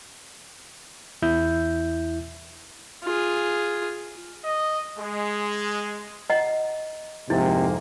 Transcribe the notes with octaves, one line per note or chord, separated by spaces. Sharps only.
E2 E4 G6
F4 G#4
D#5
G#3
D#5 F#5 A#5
F2 G#2 C3 A#3 E4